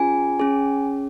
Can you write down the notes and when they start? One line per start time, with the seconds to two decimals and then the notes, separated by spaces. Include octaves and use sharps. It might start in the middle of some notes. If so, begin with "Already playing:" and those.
Already playing: C#4 F4 G#4 G#5
0.40 C#4 G#4